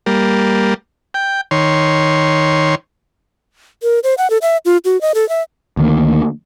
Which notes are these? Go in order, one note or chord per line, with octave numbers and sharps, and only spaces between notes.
G3 A#3
G5
D#3 C#5 C6
A#4
C5
F#5
A4
E5
F4
F#4
D#5
A4
E5
D2 D#3 A#3